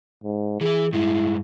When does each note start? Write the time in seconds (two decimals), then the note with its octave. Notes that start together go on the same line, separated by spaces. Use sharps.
0.24 G#2
0.61 E3 E4 G#4
0.93 G2 G#3 E4